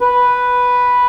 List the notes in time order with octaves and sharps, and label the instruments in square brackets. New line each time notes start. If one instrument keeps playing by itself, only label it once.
[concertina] B4